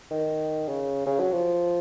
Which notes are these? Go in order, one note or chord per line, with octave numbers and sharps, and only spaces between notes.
D#3
C#3
C#3
F#3
F3